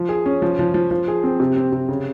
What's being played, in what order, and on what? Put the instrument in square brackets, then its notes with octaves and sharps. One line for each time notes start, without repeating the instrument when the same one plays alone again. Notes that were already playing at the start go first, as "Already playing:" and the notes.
Already playing: [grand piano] F3
G#4
C#4
F3
F3
F3
F3
G#4
C4
C3
C4
C3
C#3